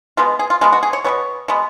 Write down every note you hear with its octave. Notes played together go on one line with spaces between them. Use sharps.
B2 G#3 B3 F4
G#4
F4
B2 G#3 B3 F4
F#4
G#4
C#5
B2 G#3 B3 C#5
B2 G#3 B3